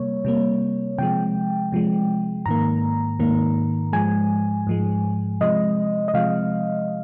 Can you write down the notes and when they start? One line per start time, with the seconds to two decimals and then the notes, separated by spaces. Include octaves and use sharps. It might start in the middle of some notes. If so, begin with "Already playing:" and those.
Already playing: C3 G3 A#3 C#5
0.25 C3 G3 A#3
0.98 C3 F3 G#3 G5
1.72 C3 F3 G#3
2.46 G#2 D#3 A#3 A#5
3.19 G#2 D#3 A#3
3.93 G#2 F3 G#3 G#5
4.67 G#2 F3 G#3
5.41 C3 F3 G#3 D#5
6.08 D#5
6.14 C3 F3 G#3 F5